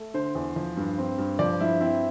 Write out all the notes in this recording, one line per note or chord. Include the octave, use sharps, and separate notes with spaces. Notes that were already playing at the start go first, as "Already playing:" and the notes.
Already playing: A3
D3 C5
E2
F3
G2
C4
G2
F3 D5
G2 E4
C4 E4